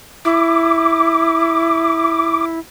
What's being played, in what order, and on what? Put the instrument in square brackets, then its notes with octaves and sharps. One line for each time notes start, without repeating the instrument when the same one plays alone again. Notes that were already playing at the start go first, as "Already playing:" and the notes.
[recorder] E4 [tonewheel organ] D6